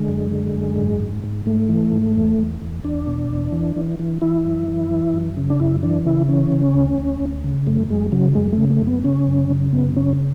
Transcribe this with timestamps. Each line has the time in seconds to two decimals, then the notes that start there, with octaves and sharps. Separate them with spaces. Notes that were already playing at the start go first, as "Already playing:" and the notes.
Already playing: D3 G#3
0.08 F#2
0.31 D3
0.54 F#2
0.77 G#2
1.00 G#2
1.24 G#2
1.46 G#2 A3
1.69 E3
1.92 G#2
2.15 E2
2.38 E2
2.61 E2
2.83 E2 D4
3.07 B2
3.30 E2
3.52 E3
3.76 E3
3.99 E3
4.21 E3 E4
4.45 F#2
4.68 E3
4.90 E3
5.14 F#2
5.37 C#3
5.50 D4
5.60 F#2 E4
5.83 E3 D4
6.05 C#3 E4
6.29 E3 C#4
6.52 C#3
6.74 D2
6.98 D2
7.20 D2
7.44 C#3
7.67 F#2 A3
7.89 F#2 G#3
8.12 C#3 F#3
8.35 F#2 G#3
8.53 A3
8.58 C#3
8.70 A3
8.81 F#2
8.87 B3
9.04 C#3 C#4
9.27 F#2
9.50 C#3
9.73 F#2 B3
9.97 C#3 C#4